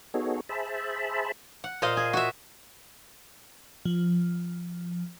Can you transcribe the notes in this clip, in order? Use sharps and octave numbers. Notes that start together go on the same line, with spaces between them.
B3 D#4 F#4 G#4 A4 C#5
G#4 C5 E5 A5 B5
F#5
A#2 C5 D#5 F5
G#4
F#4 E5
F3